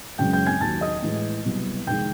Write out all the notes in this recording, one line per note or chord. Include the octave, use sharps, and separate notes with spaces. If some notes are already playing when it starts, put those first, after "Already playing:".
F#2 C#3 E3 G#3 G5 G6
G5 G6
G#5 G#6
D#2 D#3 F#3 A5 A6
D#5 D#6
A2 E3 G#3
C2 B2 F#3
F2 C3 D#3 G#3 G5 G6